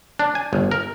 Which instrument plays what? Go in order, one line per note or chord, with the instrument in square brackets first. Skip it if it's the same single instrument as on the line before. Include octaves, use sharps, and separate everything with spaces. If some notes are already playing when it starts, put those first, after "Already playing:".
[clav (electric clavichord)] D4
G#5
G1
A#4